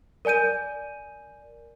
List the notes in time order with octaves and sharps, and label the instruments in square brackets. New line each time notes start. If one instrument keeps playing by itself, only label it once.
[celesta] A#4 D5 G#5 G6 D#7